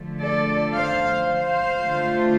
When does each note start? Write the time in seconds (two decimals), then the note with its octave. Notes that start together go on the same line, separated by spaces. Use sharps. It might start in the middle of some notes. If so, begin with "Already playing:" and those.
Already playing: D3 F3 A3
0.21 A4 D5
0.74 C5 F5
1.27 C5 F5
1.80 D3 A3 F4